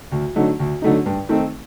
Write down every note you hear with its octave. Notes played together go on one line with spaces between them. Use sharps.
D2
D3 F#3 A3 D#4
D2
D3 F#3 A3 D#4
G2
D#3 A3 C4 D#4